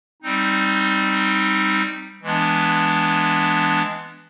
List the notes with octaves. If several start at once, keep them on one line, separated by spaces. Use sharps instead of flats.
G3 C4 D#4
E3 G#3 B3 D4